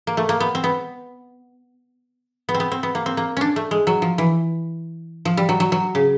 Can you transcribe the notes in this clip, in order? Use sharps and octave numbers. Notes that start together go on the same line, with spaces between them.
A#3
A3
A#3
B3
C4
B3
B3
C4
B3
C4
B3
A#3
C4
A#3
C#4 D4
A3
G#3
F#3
F3
E3
F3
G3
F#3
F#3
F#3
C#3